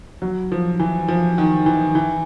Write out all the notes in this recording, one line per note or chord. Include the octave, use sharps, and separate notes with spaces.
F#3
F3
E3
F3
D#3
E3
E3